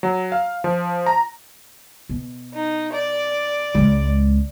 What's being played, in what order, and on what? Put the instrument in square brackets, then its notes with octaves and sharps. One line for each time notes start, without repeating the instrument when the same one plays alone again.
[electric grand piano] F#3
F5
F3
A#5
[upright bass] B2
[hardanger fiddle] D#4
D5
[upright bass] C#2 G#3